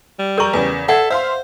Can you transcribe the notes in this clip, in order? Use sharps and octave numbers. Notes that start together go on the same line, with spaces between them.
G3
A#4 A#5 C#6 G6
E2 C#3 B4 G#5
A4 D5 E5 F#5
C5 E5 F5 C6